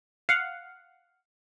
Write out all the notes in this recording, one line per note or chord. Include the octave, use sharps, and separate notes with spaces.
F5 F#5